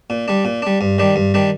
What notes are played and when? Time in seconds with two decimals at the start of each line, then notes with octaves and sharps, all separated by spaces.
0.10 A#2
0.28 G3 D4
0.45 A#2
0.62 G3 D4
0.81 G2
0.98 D#3 G3 D4
1.16 G2
1.34 D#3 G3 D4